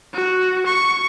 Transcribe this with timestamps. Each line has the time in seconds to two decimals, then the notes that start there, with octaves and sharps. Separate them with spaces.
0.14 F#4
0.66 C#6